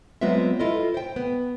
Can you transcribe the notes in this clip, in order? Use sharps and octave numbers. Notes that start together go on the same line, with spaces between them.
F#3 G#3 B3 C4 F4 E5
E4 F4 A4 D#5
C5 G5
B3